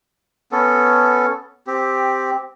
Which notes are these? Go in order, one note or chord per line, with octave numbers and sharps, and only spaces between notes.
B3 C#4 A4
C4 G4